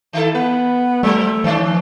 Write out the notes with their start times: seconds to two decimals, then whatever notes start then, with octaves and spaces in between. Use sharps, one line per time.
0.13 D#3 E4 A4
0.35 B3 B4
1.03 F#3 G3 A3 C4 A#4
1.44 D#3 F3 C#4 D4